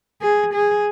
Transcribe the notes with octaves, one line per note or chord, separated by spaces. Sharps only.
G#4
G#4